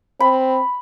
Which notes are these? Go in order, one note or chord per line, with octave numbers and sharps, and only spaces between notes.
C4 B5